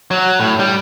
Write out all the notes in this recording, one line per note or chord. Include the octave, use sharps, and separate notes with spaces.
F#3
A2
G3